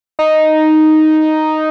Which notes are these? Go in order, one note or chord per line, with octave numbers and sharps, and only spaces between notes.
D#4